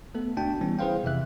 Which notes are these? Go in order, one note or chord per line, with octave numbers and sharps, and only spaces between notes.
A3 B3 A4
C#2 A3 D4 F#4 G5 A5
E3 G3 B3 C#4
E4 G#4 B4 C5 F5 G5
F2 C3 E3 E5 F#6